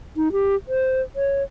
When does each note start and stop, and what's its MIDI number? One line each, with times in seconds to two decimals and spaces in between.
0.17 0.32 63
0.32 0.55 67
0.68 1.01 72
1.16 1.43 73